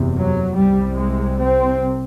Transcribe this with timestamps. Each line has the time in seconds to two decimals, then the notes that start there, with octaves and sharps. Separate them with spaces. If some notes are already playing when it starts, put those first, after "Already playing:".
Already playing: F#1 E2 C3
0.18 F#3
0.57 C2 C3 G3
0.98 G#3
1.38 C4